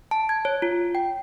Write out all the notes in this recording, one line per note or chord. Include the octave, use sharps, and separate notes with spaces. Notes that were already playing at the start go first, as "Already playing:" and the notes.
A5
G#6
C#5
F4
G5